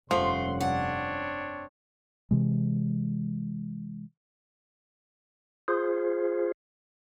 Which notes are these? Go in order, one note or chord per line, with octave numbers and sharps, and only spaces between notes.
F1 G2 F3 A3 C#4 F#5 C6
C4 D4 C#5 F#5
C3 E3 G#3
F4 G#4 C5